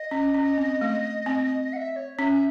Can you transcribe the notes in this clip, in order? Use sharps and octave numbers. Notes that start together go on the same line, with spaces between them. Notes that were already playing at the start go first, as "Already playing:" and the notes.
Already playing: D#5
C#4
C#4
C4
A3
C4
F#5
E5
C#5
C#4 E5